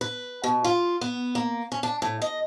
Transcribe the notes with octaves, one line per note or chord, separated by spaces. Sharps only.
B4
B2
F4
B3
A#3
C#4
D4
A2
D#5